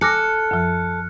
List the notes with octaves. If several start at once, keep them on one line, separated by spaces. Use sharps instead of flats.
A4 G#5 D6 F6 F#6 A#6 C#7
F#2 F3